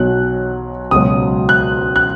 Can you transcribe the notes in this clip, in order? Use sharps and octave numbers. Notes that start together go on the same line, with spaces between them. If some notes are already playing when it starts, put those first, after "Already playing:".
Already playing: B1 B2 F#3 F#6
C#2 B2 F#3 D#6
F#6
F#6